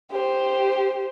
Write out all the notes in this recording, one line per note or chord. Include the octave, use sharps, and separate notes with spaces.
G4 C5